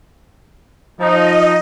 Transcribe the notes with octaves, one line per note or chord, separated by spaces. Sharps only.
F3 D#4 D#5